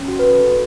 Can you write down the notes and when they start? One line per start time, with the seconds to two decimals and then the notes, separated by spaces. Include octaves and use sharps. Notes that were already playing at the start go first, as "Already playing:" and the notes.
Already playing: C#4
0.08 F#4
0.19 B4
0.32 A4